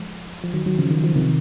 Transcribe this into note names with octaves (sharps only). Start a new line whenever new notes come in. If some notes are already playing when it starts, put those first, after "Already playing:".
Already playing: F3 G#3
F3
D#3 F#3
D#3 F#3
C#3 F3
D#3
F3
C3 D#3